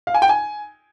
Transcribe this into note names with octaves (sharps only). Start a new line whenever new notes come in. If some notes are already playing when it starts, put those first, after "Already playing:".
F5
G#5
G5
G#5